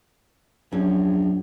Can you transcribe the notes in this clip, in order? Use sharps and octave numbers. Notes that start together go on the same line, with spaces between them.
A#1 F#2 C#4